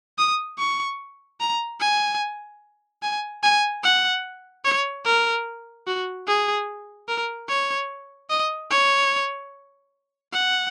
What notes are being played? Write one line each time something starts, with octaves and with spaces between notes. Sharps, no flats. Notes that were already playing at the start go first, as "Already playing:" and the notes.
D#6
C#6
A#5
G#5
G#5
G#5
F#5
C#5
A#4
F#4
G#4
A#4
C#5
D#5
C#5
F#5